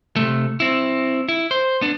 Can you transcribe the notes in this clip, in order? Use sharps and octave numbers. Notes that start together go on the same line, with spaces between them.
C3 A3
C4 E4
E4
C5
B3 D4